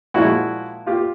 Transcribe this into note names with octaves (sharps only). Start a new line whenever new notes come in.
A#2 F3 G#3 E4 F#4
F4 G4